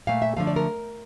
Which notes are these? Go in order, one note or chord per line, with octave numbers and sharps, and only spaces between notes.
A#2 A3 F5
E5
D3 F3 A3 F5
D5
A#4